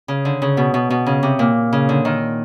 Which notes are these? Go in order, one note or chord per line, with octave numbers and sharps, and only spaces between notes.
C#3
D3
C#3
B2
B2
B2
C#3
C3
A#2
C#3
D3
D#3